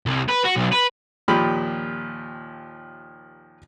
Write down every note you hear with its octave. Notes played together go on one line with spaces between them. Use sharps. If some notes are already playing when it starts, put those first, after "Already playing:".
C2
B4
F#4
B1
B4
D#2 A#2 F3 G4 B5 F6